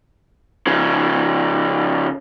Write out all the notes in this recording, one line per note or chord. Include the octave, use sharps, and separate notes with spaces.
C#3 F3